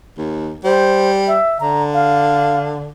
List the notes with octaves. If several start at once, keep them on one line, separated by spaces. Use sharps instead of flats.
D#2
G3 C5
E5
D3 A#5
F5